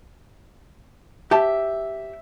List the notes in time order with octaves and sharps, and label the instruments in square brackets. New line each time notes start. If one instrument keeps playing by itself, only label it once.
[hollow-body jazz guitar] G4 A5 [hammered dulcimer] E5